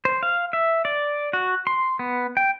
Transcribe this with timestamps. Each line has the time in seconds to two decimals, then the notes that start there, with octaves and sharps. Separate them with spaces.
0.05 C5
0.23 F5
0.53 E5
0.85 D5
1.33 F#4
1.67 C6
1.99 B3
2.37 G5